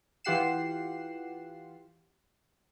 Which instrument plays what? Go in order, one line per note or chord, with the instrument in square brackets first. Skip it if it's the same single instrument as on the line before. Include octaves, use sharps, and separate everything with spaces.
[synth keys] E3 F4 G4 F#5 C7 E7